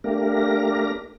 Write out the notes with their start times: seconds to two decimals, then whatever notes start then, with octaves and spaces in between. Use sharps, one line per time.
0.04 A3 A#3 D4 G4 A#4 A#6